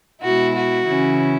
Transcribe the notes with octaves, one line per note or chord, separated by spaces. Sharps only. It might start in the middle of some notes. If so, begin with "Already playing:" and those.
B2 G#3 E4 F#4
F#4
C#3 E3 C#4 E4